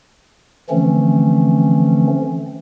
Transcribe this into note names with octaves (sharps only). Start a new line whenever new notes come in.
D3 E3 F3 A3 C4 C#4